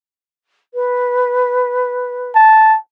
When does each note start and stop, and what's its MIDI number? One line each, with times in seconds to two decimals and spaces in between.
0.74 2.31 71
2.35 2.77 81